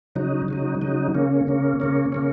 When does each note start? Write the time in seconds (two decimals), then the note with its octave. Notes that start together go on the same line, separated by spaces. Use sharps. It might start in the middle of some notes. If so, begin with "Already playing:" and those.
0.16 C#3 F#3 D#4
0.48 C#3 F#3 D#4
0.82 C#3 F#3 D#4
1.15 C#3 A#3 C#4
1.47 C#3 A#3 C#4
1.80 C#3 A#3 C#4
2.12 C#3 A#3 C#4